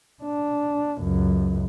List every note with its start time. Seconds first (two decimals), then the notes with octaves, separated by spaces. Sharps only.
0.23 D4
1.01 C#2 F#2